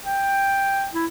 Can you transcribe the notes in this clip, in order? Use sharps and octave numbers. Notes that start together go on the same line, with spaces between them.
G5
E4